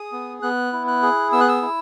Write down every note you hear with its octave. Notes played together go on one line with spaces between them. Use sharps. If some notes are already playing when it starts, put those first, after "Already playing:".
Already playing: G#4 D#6
B3
B3 F#6
E4
F#6
G#4
B3 E6
F#6
E6
E4